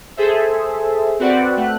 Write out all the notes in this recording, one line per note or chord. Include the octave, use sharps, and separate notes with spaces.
G#4 A4 C5 E5
C4 F#4 B4 D5 F#5
A3 F#6